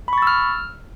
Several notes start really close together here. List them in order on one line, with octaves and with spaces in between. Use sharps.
B5 C#6 A6 E6 F6